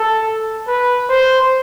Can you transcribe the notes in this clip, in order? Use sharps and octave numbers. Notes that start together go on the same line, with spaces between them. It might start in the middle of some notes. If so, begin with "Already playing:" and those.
Already playing: A4
B4
C5